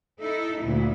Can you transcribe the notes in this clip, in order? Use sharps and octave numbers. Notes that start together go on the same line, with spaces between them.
D#4 E4 A4
D2 A#2 E4